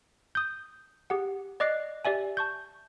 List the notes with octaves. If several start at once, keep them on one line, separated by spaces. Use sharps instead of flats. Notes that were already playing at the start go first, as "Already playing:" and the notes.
D#6 G6
G4 G#4 F#5
D5 D#5 D6 F#6 C7
G4 D5 E5 G#5
A5 C#6 G6